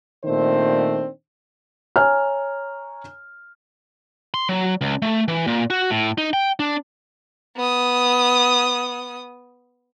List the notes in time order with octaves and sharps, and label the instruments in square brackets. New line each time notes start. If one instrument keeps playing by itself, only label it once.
[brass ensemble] A#2 D#3 A3 C4 D4 C5
[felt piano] C#5 G#5 A#5 F6
[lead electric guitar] C6
F#3
C#2
A3
E3
A#2
F#4
A2
D#4
G5
D4
[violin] B3 D#6